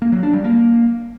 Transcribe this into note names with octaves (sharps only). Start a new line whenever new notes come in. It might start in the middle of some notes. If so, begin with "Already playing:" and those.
A#3
F#3
D4
G3
A#3